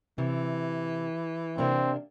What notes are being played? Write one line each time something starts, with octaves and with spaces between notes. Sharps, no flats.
C3 E3
C3 A#3 C4 D4